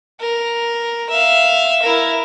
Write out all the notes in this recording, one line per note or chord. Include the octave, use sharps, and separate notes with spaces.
A#4
E5 F5
E4 A#4